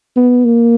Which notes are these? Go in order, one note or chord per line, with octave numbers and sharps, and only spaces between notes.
B3
A#3